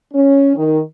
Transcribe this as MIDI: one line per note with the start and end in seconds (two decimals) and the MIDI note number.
0.13 0.55 61
0.56 0.79 51